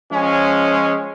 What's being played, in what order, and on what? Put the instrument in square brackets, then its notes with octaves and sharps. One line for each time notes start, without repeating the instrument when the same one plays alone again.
[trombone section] F3 G#3 C#4